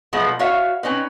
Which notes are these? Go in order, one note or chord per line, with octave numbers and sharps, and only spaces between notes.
B2 F3 F#3 G#3 A3 B3
F#4 C#5 E5 F5
C4 C#4 D#4 B4